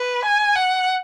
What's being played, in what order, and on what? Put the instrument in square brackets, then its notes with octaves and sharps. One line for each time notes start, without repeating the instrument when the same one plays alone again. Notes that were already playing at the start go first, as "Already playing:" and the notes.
Already playing: [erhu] B4
G#5
F#5